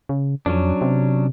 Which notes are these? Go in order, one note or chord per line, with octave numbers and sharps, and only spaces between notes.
C#3
F2 F#3 C#4 D4
C3